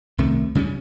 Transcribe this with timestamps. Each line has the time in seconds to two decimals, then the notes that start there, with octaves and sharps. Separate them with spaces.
0.18 C2 C3 D#3 A3
0.55 C#3 G3 C4 C#4